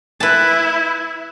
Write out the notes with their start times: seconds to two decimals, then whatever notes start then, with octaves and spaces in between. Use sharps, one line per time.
0.20 E4 B4 A5